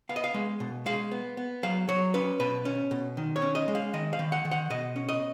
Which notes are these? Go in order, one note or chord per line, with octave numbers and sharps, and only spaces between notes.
B3 F5
D#5
F5
G#3
B2
G#3 F5
B3
B3
F#3 F5
F#3 C#5
C#4 B4
B2 B4
C#4
B2
D#3
C#5
C#4
D#5
G#3
F5
D#3 D#5
F5
D#3
F#5
D#3
F#5
B2 D#5
C#4
D#5